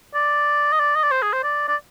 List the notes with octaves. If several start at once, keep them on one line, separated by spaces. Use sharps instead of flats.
D5
D#5
D5
D#5
D5
C5
G#4
C5
D5
D5